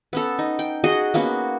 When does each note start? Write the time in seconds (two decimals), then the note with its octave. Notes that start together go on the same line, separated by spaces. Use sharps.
0.13 B3 C#4 A4
0.39 D#4
0.59 G5
0.84 F#4 G#4 D#5 F#5
1.14 A#3 B3 C#4 F#4